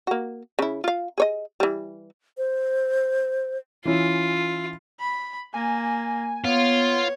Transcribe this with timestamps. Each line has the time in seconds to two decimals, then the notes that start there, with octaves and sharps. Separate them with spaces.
0.07 A#3 F#4
0.59 C#3 E4
0.84 F4 F5
1.18 G#4 C#5 D#5
1.60 E3 G3
2.38 C5
3.85 E3 C#4 E4 F4
5.00 B5
5.54 A#3 G#5
6.45 B3 F4 C#5